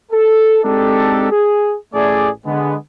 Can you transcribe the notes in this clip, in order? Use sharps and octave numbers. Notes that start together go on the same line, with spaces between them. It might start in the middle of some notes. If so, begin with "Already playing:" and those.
A4
G#3 C4 D4 D#4 G4 A4
G#4
A1 A3 G#4 D5
D3 G#3 B3